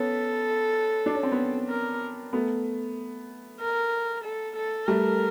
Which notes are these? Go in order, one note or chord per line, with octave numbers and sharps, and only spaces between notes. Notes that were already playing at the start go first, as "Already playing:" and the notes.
Already playing: B3 C#4 A4
D4
C#4
C4
B3 C#4
A#4
A3 B3
A#4
A4
A4
G3 A3 A#4